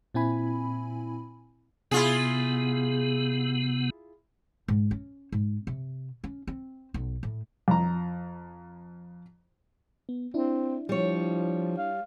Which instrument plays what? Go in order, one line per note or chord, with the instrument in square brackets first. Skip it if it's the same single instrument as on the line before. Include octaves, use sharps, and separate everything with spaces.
[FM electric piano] A#2 C4 E4 G#5 B5
[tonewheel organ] C3 B3 [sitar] E4 F4 G#4
[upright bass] G#2
C#4
G#2
C3
C#4
C4
B1
A2
[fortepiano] F2 A#5
[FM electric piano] B3
[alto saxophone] C4 [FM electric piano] D4 E4
[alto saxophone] F3 [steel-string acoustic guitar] G3 C#5
[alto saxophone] F5